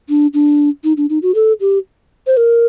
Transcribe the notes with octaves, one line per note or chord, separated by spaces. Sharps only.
D4
D4
D#4
D4
D#4
F#4
A4
G4
C5
A#4